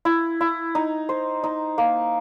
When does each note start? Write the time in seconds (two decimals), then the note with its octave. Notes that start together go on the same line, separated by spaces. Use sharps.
0.05 E4
0.41 E4
0.75 D#4
1.09 C5
1.44 D#4
1.78 A#3